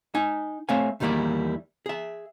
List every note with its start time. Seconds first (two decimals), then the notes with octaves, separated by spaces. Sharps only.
0.15 D#4 G#5
0.69 A3 C4 C#5 E5 F5 G#5
1.00 E2 D#3 G3 A#3 E4 D5
1.86 G#4 E5